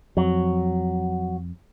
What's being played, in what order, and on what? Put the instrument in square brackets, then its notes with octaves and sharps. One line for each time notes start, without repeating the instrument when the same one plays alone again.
[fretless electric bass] F2 [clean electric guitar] F#3